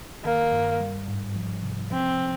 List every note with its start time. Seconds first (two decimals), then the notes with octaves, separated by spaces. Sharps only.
0.24 D#3 A#3
0.52 G2
0.80 G3
1.08 G#2
1.36 F3
1.63 C3
1.91 F3 C4